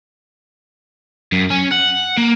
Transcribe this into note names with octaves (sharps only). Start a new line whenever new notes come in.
F#2
C#4
F#5
A#3